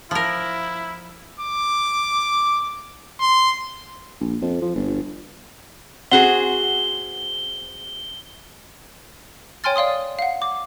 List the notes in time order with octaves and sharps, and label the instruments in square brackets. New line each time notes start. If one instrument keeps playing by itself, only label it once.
[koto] F3 A#4 [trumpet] E4
[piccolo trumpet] D6
C6
[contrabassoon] A#1
F2
F3
G1
[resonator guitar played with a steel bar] C4 F#4 G#4 [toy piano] F#5 [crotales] G7
[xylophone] C#5 G5 G#5 C6 F6 A6
D5 F5 C6 D#6
F5 F#5
D6